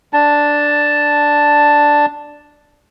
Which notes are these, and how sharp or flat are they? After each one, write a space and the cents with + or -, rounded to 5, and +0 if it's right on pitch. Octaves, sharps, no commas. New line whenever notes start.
D4 +0 A5 +0